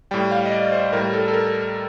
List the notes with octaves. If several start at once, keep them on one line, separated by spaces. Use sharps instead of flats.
A2 G3 G5
F5
D#5
D5
C5
A2 G3 A#4
A4
A4
A#4